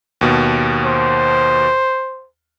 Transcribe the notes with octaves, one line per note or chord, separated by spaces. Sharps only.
D#2 B2
C5